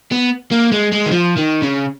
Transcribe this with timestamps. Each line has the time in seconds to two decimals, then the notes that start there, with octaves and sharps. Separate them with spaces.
0.12 B3
0.51 A#3
0.72 G#3
0.92 G#3
1.06 D#3
1.11 F3
1.37 D#3
1.63 C#3